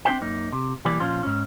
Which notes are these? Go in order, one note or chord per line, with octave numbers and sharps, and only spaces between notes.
C4 D4 G#4 C5 E5 G5
F#2 A#3 D#4
C3
B1 E3 G3 A#3 D5
A#2 F3 C#4 F4 C5
G#2 C#4